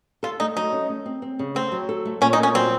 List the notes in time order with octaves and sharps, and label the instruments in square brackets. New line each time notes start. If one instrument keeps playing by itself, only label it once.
[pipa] F4 [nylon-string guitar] A4
[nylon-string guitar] A3 [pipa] D#4
[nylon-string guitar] F#3 [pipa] D#4
[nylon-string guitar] C#4
A3
C4
C4
C#3
[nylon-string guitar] A3 [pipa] C4
[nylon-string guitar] F#3
A4
A3
[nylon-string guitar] A#2 [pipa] C#4
[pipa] D#4
[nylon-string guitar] A#2
[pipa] C#4
[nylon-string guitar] F#3 [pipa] C4